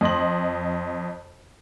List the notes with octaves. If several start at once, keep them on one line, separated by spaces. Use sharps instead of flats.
F2 D#5 C6 F#7